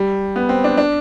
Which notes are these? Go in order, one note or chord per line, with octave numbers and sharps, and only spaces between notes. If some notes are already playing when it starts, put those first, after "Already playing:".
Already playing: G3
B3
C4
D4
D4